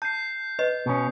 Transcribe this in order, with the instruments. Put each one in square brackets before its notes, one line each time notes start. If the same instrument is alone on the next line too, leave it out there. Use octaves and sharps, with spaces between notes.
[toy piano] A5 [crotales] G6 C7
[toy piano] B4 D#5
[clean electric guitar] B2 C#4